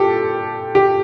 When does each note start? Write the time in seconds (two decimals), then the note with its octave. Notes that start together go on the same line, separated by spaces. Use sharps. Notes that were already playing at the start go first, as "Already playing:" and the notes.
Already playing: A#2 G4 A4
0.75 G4